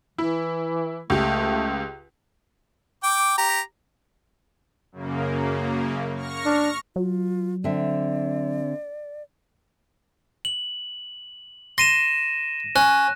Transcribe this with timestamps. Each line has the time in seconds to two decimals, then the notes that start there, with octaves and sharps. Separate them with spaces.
0.18 E3 E4
1.10 C#2 A3 G4
3.04 G5 D6
3.38 G4 A#5
4.92 F#2 C#3 A#3
6.15 C#6 F6 A#6
6.46 D4
6.96 F#3 F4
7.64 D3 C4 D5 E5
10.45 F#7
11.78 C6 A#6 D#7 E7
12.76 C#4 F#6